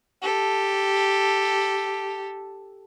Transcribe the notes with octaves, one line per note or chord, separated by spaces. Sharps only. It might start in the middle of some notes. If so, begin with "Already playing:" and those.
G4 A4